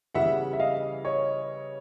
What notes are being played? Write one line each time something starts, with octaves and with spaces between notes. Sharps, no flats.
C#3 E3 G3 B3 E5 F#5
E5
D#5 F5
C#5 D#5